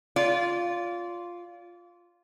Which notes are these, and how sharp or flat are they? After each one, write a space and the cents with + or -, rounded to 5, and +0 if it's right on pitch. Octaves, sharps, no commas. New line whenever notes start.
F4 +0 D5 -35